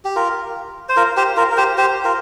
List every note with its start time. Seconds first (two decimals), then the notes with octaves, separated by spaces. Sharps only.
0.05 G4
0.16 F4 A#4
0.89 C5
0.97 F4 A#4
1.17 G4 C5
1.37 F4 A#4
1.52 A#4
1.57 G4 C5
1.78 G4 C5
2.05 F4 A#4